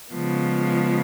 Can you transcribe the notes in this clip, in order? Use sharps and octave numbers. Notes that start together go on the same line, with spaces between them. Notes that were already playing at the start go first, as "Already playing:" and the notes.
C#3 F3 G#3 B3